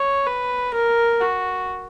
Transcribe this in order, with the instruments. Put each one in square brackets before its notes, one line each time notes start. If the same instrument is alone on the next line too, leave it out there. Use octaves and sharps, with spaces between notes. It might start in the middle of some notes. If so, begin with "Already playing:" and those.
Already playing: [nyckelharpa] C#5
B4
A#4
F#4